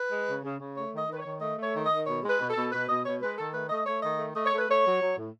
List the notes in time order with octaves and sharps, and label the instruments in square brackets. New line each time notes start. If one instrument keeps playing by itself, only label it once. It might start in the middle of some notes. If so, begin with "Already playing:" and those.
Already playing: [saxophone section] B4
G#3
C#3
C#3
C#3
A3 C#5
D#3 D#5
D#3
B4
C#5
D#3
A3 D#5
A3
C#5
D#3
D#5
D#3
B2 C#5
G#3
B4
B2
B2 A4
B2 B4
B2 D#5
B2 C#5
G#3 B4
D#3 A4
A3 B4
A3 D#5
A3 C#5
D#3 D#5
A3
A3 D#5
C#5
A3
B4
A3 C#5
F#3
F#3
A2